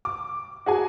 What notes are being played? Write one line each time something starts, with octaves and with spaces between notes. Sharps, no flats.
D6
F#4 G#4 G#5